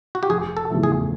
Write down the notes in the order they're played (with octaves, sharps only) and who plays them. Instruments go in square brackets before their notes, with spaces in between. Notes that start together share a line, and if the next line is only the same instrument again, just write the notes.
[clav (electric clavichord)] F#4
G4
[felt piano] F1 [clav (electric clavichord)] G#4
[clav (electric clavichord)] A4
[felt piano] E2 C#3 F3 A3
[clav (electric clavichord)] G#4